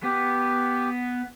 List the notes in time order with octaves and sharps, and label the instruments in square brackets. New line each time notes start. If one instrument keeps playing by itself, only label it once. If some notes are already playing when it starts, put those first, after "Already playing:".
[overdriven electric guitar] B3 [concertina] G4